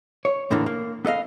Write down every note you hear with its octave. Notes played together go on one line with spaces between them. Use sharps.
C#5
E2 A2 D3 E3 A#3 D4
A#3
B3 A4 D#5 F5